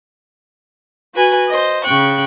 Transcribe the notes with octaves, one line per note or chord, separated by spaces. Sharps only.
F#4 B4 G#5
C5 D#5
C#3 G5 C#6 F#6